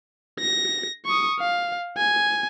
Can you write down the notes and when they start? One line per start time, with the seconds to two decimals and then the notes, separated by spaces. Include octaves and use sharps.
0.40 A#6
1.06 C#6 D#6
1.40 F5
1.97 G#5